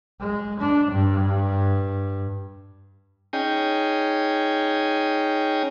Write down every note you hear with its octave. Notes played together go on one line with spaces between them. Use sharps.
G#3
D4
G2
C#4 D#4 G#4 G5